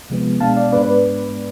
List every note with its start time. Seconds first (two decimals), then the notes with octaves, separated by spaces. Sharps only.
0.10 C3 F3 G#3 B3
0.40 B2 G#3 B3 D4 F5 A5
0.56 D5 F5
0.72 G#2 G#3 B3 D4 B4 D5
0.83 B4 D5